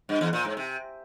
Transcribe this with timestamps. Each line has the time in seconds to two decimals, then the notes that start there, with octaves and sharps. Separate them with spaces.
0.09 G2
0.21 E2
0.33 A#2
0.45 G#2
0.57 C3